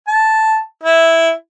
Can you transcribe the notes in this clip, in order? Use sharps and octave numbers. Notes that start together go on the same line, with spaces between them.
A5
E4